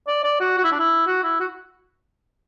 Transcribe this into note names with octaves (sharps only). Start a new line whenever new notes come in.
D5
D5
F#4
F#4
E4
D4
E4
F#4
E4
F#4